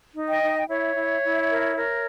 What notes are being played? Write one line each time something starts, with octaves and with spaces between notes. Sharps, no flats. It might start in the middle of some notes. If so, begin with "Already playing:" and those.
D#4
D#5 G5
D#4
G5
E4 C#5 E5
E4
E4
A#4
A#4